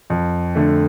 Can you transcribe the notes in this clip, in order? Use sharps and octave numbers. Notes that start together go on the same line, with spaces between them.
F2
D3 A3